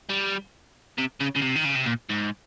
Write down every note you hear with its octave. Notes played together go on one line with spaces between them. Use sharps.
G3
C3
C#3
C#3
C3
D#3
C#3
C3
A#2
G#2